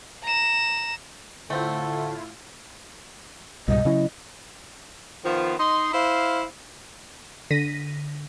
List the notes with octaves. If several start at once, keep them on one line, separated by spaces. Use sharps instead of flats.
A#5 E7
A2 D3 A3 C4 E4 F4 A4
C2 G#2 B2 G3 D#5
C#3 F#3 C#4 E4
D#3 F3 B3 F4
D#4 D#5 C6
E4 C5 F5
D3 A#6 B6 D#7